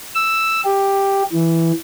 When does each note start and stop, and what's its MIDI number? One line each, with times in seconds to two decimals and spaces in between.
0.15 0.61 88
0.65 1.23 67
1.32 1.72 52